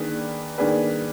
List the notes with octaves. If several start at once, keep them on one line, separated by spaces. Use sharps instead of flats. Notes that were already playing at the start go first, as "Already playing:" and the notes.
Already playing: D#3 A#3 D4 G#4 B4
D#3 A#3 D4 G#4 B4